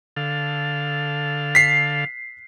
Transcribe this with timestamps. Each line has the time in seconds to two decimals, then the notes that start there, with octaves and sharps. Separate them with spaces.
0.17 D3 A4 F5
1.55 B6 C7